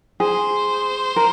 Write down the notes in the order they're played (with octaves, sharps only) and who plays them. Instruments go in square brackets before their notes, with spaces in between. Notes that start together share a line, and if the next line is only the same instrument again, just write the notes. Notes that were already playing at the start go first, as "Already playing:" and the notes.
[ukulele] G#4 [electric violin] C5
[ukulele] A#4